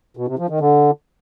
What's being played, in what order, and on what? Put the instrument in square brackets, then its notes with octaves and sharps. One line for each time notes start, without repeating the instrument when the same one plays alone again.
[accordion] B2
C3
F3
D#3
D3